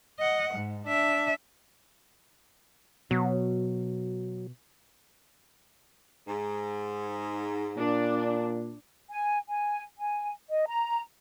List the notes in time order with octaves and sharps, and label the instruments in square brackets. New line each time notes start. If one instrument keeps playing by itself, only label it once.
[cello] D#5 F#5
G#2
D4 E5
[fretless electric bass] B2 [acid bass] F#3
[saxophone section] G#2
[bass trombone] A#2 [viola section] D4
[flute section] G#5
G#5
G#5
D#5
A#5